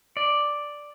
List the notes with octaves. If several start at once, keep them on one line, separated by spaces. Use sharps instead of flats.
D5